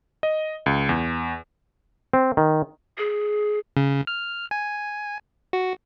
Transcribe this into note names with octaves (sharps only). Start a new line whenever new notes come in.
D#5
C#2
E2
C4
D#3
G#4
C#3
F6
G#5
F#4